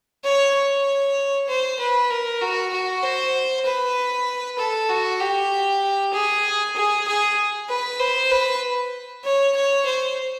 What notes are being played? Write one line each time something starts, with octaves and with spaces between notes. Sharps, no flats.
C#5
C#5
C5
B4
A#4
F#4
F#4
C5
B4
A4
F#4
G4
G#4
G#4
G#4
B4
C5
B4
C#5
C#5
C5